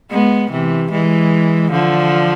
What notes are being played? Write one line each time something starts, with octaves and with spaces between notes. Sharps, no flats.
G#3 B3
C3 E3
E3 G#3
D3 F3